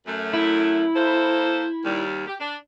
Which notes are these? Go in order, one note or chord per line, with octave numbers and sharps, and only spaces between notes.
F#2 A3
E4
A#3 A4 C5
D#2 G3
G4
D4